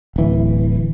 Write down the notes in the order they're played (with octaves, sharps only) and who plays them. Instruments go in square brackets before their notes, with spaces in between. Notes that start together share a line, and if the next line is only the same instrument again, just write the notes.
[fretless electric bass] D1 E3